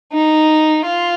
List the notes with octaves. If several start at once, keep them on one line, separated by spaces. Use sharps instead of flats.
D#4
F4